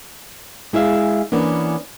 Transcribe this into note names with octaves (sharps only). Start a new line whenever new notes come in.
G#3 E4 G#4 E5 F5
E3 A#3 B3 C#4 D4